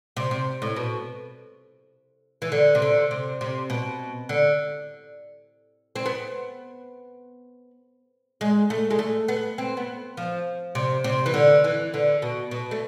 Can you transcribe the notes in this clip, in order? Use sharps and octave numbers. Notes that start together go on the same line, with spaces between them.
C3
C3
A2
B2
E3
D3
C3
D3
C3
C3
B2
D3
C4
B3
G#3
A3
G#3
A3
B3
C4
B3
F3
C3
C3
E3
D3
E3
D3
B2
B2
A3